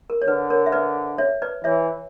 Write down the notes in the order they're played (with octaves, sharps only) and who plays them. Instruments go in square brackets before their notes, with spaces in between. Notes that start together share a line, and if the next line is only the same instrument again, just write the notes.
[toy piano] A#4
C#5
[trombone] D3 [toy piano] B4
[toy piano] A#4 C#5
E5
B4 D5
C#5 E5
B4 D5
[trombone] E3 [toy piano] C#5 E5